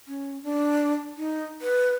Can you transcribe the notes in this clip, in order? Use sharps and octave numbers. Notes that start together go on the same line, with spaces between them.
C#4
D4
D#4
B4